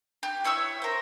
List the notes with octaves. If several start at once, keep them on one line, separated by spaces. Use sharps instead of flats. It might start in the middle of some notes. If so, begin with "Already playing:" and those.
G4
E4 C#5 E5 E6
A#4 C5